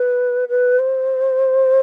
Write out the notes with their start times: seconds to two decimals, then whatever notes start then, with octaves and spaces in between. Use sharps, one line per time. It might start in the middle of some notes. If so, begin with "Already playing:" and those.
Already playing: B4
0.49 B4
0.79 C5